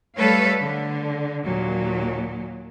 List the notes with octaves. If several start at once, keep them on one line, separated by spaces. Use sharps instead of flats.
G3 A3 A4 B4 C#5 F5
D3
D#2 A#2 F#3